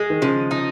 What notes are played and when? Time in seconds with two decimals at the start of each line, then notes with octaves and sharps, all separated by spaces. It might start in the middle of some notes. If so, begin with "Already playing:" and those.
Already playing: G#3
0.10 D#3
0.22 C#3 F3
0.51 D#4